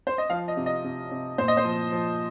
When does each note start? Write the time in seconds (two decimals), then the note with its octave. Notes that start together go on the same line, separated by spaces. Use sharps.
0.07 C5
0.18 D#5
0.30 F3 F5
0.48 D#5
0.57 C3
0.66 D#5
0.84 C3
1.11 C3
1.38 A#2 C5
1.48 D#5
1.57 C5
1.64 F3
1.92 F3